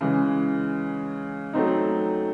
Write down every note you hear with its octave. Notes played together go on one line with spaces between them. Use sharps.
C#3 E3 G#3
F#3 A3 C4 D#4